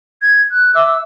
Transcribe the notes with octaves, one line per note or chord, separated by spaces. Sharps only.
G#6
F#6
E5 D6 E6